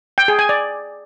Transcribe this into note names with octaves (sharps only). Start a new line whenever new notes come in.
G5
G#4
G#5
D5